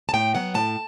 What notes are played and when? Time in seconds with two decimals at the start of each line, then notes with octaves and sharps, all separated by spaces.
0.09 A5
0.13 A2 G5
0.34 F#3 B3 F#5
0.54 A2 A5